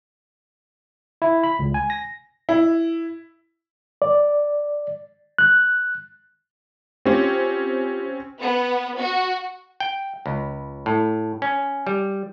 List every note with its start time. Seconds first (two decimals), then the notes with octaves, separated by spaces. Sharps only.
1.22 E4
1.43 B5
1.59 C#2
1.74 G#5
1.90 A#6
2.49 E4
4.02 D5
5.38 F#6
7.05 C4 C#4 F4 G4
8.41 B3
8.97 F#4
9.80 G5
10.26 C#2
10.86 A2
11.42 C#4
11.87 G3